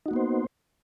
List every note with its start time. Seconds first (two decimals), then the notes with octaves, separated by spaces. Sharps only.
0.06 D#4
0.08 F#4
0.11 A#3
0.13 B3
0.16 C5